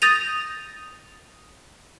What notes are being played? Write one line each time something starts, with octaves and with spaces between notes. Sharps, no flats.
D#6 G6 A6 A#6 D#7 F7